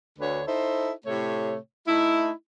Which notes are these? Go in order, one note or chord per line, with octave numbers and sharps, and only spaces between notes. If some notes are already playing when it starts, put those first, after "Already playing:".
D2 D3 A3 B4 C#5
D#4 E4 A4 C5
A2 C3 A3 C#5
A3 D#4 E4